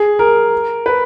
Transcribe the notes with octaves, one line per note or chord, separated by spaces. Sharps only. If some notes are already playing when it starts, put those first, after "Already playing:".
Already playing: G#4
A#4
B4